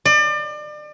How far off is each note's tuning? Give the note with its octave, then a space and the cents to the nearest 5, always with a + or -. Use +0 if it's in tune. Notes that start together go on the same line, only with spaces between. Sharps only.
D5 +35